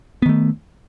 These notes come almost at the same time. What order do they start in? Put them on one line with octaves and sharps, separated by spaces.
B3 D#3 A3